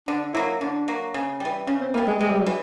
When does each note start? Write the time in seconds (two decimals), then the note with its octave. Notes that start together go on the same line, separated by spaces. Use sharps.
0.08 D3 D4
0.34 F#3 A#3 E4
0.61 D3 D4
0.88 F#3 A#3
1.14 C#3
1.40 E3 G3
1.67 C#3 C#4
1.81 C4
1.94 E3 A#3
1.98 G3
2.07 G#3
2.20 C3 G#3
2.30 G3
2.40 F#3
2.47 E3